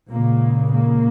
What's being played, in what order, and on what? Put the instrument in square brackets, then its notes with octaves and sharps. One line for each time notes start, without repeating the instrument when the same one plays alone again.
[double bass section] C#2 A#2 C#3 A#3
A#2 A#3